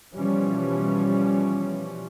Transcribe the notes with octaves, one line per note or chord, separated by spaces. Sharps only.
B2 E3 F3 G3 C#4